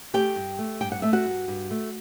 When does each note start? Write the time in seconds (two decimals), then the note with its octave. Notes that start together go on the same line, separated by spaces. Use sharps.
0.14 A3 G4 G5
0.36 G2
0.59 A3
0.81 G2 G5
0.92 F#5
1.02 A3 E5
1.13 F#4 F#5
1.26 G2
1.48 G2
1.71 A3